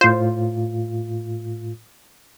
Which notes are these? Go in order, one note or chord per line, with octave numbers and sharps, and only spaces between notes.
A2 F4 C5